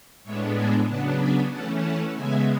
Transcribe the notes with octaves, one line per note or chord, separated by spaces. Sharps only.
A2 G#3 B3 D4 C#5 E5
E5 G#5
C#3 F#3 B3 D4 F#5 A5
G#5 B5
E3 A3 C#4 F#5 A5
F#5 A5
C#3 G#3 B3 E5 G#5